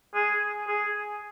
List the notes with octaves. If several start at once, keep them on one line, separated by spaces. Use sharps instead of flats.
G#4
G#4